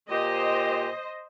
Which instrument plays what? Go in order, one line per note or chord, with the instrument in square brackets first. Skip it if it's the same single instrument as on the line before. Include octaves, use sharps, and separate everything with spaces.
[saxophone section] A#2 G4 [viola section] C5 D#5